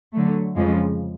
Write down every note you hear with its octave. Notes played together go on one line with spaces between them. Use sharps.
D3 F#3 A3
F2 C#3 F3 G#3